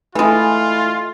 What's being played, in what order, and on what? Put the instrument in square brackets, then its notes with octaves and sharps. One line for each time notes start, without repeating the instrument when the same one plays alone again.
[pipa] E3 G#3 [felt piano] A3 E4 [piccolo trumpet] F4